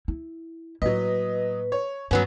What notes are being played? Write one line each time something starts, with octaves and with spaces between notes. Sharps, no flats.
E4
A2 F#3 A#3 B4 D#5
C#5
G2 F#3 B3 C#4